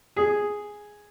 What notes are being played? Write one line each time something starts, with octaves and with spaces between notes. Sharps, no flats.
G#4